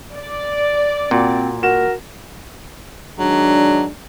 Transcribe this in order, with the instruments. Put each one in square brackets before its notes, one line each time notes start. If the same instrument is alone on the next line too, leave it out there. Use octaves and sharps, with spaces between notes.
[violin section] D5
[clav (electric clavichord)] A#2 [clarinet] C4 [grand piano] F#4
[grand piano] F#4 E7 [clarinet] A#4
[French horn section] D#3 G#3 D4 [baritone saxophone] F#3